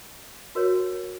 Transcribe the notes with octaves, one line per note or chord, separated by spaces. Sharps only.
F#4 A#4 C#5